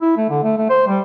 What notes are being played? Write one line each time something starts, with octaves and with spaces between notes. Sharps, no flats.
E4
A3
D3
A3
A3
C5
G3